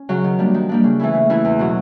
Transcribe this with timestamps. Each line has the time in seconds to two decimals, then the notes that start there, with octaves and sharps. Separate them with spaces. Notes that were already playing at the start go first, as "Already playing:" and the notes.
Already playing: C#4
0.09 C#3 F#3
0.24 D#3
0.39 G3 A#3 D4
0.54 D#3
0.69 G3 A#3 D4
0.84 C#3
0.99 E3 A3 C#4 E4
1.14 C#3
1.30 E3 A3 C#4 E4
1.45 E2
1.59 B2 F#3